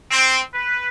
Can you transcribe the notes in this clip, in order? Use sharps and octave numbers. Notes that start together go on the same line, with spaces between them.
C4
B4